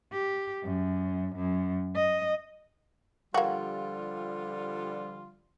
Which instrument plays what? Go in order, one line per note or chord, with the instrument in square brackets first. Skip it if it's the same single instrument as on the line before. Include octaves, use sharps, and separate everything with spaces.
[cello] G4
F#2
F#2
D#5
[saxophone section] D3 F3 G3 [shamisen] A#3 F#4 [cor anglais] F4 [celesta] F5 G5